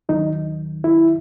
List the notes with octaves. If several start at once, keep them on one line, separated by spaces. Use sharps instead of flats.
D#2 D#3 F#3 D#4
E4